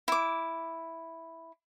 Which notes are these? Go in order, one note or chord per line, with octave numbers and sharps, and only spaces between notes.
E4 D6